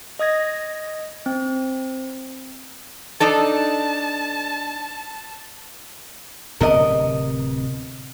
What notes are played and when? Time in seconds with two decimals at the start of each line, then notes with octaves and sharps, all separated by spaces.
0.19 D#5 D#6 G#6 A#6
1.26 C4
3.20 D4 D#4 A4 A5
6.61 D1 C3 B3 A#4 D#5